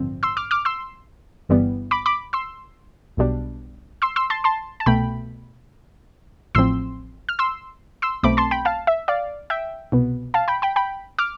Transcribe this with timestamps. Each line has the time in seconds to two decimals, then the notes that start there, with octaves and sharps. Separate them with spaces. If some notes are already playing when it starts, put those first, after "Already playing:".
Already playing: A1 G2 D3 F3 C4
0.23 C6 E6
0.37 D6 F6
0.51 D6 F6
0.65 C6 E6
1.49 G1 G2 E3 G3 B3
1.91 B5 D6
2.06 B5 D6
2.33 C6 E6
3.17 B1 B2 G3 D4
4.02 C6 E6
4.16 C6 E6
4.30 A5 C6
4.44 A5 C6
4.80 A5
4.86 C2 B2 A3 G5 B5
6.55 A1 A2 F3 C4 C6 E6
7.29 F6
7.39 C6 E6
8.02 C6 E6
8.23 B1 B2 A3 C4 B5 D6
8.37 A5 C6
8.51 G5 B5
8.65 F5 A5
8.87 E5
9.08 D5 F5
9.50 E5 G5
9.92 C2 B2 B3
10.34 F5 A5
10.48 G5 B5
10.62 G5 B5
10.76 G5 B5
11.19 D6 F6